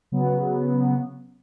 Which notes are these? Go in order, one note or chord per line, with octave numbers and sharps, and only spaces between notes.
C#3 F#3 B3